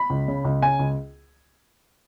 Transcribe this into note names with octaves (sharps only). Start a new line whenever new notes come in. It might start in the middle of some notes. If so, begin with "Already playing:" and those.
Already playing: B5
C#2
C#3
C#2
C#3 G#5
C#2